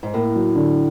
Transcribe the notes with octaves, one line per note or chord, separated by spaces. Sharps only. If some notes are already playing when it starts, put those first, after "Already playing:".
G#2
A2 A#3
F#3
D3